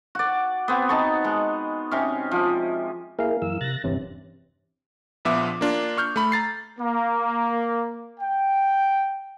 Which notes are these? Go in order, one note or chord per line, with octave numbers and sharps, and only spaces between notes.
F#4 D5
B3 C4
D#4 A5 C#6
G#3
C3 C#4
F3
A#3 E4 G#4 A#4 F5
F#2 E3 E6
C3 F#6 A6 A#6
D1 E2 G2 C3 E3 C#4
A#1 F3 B3 E5 D6
A#3 D4 F4
C#6 F6 G6
A3 B5
A#5 A6 C7
A#3
G5